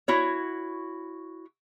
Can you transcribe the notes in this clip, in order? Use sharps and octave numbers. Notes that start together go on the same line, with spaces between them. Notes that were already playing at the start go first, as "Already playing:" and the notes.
E4 F#4 C#5